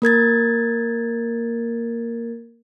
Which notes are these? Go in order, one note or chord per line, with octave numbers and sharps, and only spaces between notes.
A#3 A#4 G#6 A6